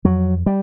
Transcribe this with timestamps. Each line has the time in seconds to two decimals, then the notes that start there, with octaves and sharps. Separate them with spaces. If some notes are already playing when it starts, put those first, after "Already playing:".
0.04 F2 F#3
0.46 G3